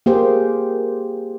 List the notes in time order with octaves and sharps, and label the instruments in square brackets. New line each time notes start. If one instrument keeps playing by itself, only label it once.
[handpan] A#3 G4 G#4 C5